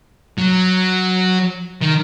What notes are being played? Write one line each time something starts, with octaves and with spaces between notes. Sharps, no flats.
F#3
D#3